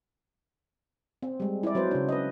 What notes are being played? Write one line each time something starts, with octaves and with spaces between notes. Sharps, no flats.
C4
G3 G#3
E4 D5
F#3 C4 B4 C5
C#3 D4
B4 D#5